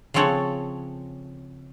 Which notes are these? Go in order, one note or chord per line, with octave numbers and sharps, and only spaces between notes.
C#3 F3 C4 A4 C#5 F#5